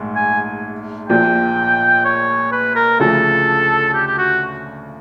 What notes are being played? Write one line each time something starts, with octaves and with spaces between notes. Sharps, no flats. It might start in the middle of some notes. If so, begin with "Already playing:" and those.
Already playing: A#1 G#2 A3
G#5
A#1 A#2 F3 G5
C#5
B4
A#4
D2 C#3 F3 A4
G4
G4
F#4